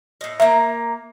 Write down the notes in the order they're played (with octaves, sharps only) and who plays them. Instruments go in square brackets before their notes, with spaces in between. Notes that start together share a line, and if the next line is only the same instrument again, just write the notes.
[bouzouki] A2 D#5
[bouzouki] A#3 A#5 [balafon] E5